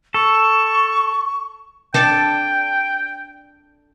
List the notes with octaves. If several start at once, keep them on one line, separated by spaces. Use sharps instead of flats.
A4 C#6
D4 A4 G5